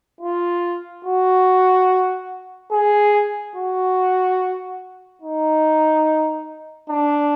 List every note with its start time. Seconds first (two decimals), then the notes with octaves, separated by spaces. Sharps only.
0.21 F4
1.05 F#4
2.72 G#4
3.56 F#4
5.22 D#4
6.89 D4